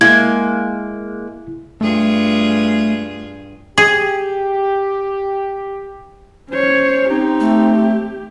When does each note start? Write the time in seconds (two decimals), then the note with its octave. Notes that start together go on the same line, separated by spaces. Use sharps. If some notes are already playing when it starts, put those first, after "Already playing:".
0.01 G#3 A#3 E4 G#6
1.81 G2 A3 F4 G#4
3.78 G4 G#4
6.51 C#4 C5 C#5
7.10 C4 D#4 G4
7.40 A3